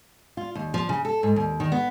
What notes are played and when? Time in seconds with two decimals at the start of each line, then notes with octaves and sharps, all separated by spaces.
0.37 F4
0.55 D#2
0.74 F3
0.89 C#3
1.05 A4
1.23 G#2
1.36 D#2
1.60 D#3
1.72 B3